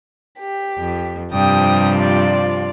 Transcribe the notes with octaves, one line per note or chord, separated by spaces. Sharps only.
G4 B6
F2
G2 C3 F3 G5 D#6
F4 D5